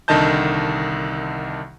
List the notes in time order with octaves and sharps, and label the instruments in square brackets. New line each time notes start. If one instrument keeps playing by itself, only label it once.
[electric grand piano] C2 D3 D#3 D#5 A5 G6